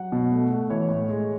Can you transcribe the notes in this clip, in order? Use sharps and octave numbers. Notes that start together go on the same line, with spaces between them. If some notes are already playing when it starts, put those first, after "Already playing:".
Already playing: F#3 F#5
B2
A3
A3
E3 C#5
A2
G#3